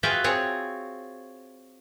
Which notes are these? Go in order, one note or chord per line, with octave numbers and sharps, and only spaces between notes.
F4 F#4 G#4 B4 E5 G5
C4 G#4 C#5